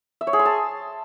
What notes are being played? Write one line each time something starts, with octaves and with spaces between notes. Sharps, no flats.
E5
C#5
G#4
C6
A5